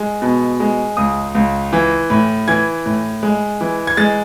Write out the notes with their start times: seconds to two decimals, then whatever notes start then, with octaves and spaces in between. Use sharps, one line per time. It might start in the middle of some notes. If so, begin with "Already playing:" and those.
Already playing: G#3
0.22 B2
0.60 G#3
0.97 C#2 D#6
1.35 C#2
1.73 E3
2.10 A2
2.48 E3 G#6
2.85 A2
3.23 G#3
3.61 E3
3.87 G#6
3.97 G#3 A6